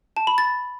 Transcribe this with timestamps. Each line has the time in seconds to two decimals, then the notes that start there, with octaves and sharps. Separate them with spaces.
0.17 A5
0.27 B5
0.38 A6